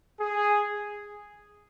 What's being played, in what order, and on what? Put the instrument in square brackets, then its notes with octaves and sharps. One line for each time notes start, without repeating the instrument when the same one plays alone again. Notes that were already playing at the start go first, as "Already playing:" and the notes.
[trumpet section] G#4